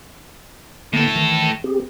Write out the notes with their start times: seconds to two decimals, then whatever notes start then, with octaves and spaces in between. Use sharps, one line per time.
0.93 A2 D3 A#3 B3 A4
1.16 D#3 E3
1.64 C4 G4 G#4